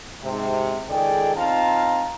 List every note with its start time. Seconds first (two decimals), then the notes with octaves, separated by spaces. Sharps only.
0.24 G#2 C3
0.89 C#2 D#3 G#4 A4 D5 G5
1.37 C4 D#4 F4 F5 A5 A#5